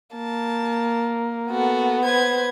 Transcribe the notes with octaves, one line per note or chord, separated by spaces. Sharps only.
A#3 A5
B3 F#4 A4
B4 C5 G#6